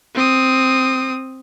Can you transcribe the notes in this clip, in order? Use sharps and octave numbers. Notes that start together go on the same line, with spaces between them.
C4 D#6